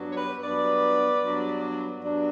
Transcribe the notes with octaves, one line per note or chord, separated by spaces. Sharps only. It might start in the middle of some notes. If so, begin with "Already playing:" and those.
Already playing: G2 F#3 B3 D4
C#5
G4 B4
G2 F#3 B3 D4 B4 D5
G2 F#3 B3 D4
G2 F#3 B3 D4